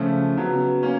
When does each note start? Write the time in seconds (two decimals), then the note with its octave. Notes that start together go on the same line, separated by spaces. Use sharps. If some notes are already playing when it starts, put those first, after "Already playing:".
Already playing: C#3 F3 A3
0.36 C#3 F#3 B3
0.83 A#3 C#4